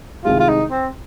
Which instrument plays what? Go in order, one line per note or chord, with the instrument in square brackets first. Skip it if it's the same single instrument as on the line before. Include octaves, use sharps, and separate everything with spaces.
[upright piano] C2 C3 D#3 G#3 [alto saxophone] F4
[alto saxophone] F4
D#4
C4